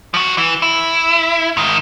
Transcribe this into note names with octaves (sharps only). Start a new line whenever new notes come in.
F3 F#4
E3
E4
G#2 D#3